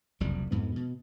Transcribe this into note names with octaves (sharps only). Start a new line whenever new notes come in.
F#1 C2 F2 G3
F2 G#2 B3
B2